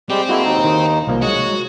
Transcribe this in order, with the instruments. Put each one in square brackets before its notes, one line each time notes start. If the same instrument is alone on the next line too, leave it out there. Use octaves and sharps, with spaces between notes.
[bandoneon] G3 G#3 G4 [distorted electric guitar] C4
[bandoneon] G#3 A#3 E4 [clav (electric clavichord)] F#4 A4
[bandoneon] D#2 D#4
[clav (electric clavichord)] D#3
C2 F3 A#3
[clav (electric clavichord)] G#3 [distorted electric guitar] F#4 [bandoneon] C#5